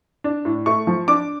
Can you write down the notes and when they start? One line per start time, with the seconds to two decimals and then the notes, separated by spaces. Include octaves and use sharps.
0.24 D4
0.45 A2
0.66 A3 C#6
0.87 F3
1.08 D4 D6